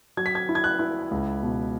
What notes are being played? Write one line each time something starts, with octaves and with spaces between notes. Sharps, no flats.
F#3 G#6
B6
G#6
E4
G#6
F#6
E4
C#2
B2